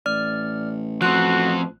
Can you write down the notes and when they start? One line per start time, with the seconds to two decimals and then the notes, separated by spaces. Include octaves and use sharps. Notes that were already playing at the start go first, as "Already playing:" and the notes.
0.06 A1 D5 F6
1.02 F3 C4 F#4 F#6